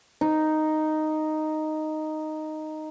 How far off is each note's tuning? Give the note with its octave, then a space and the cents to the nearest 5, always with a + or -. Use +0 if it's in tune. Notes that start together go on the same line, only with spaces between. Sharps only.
D#4 -5